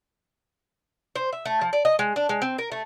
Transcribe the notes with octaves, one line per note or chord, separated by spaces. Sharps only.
C5
E5
A3
F3
D5
D#5
G#3
D4
G#3
C4
A#4
A3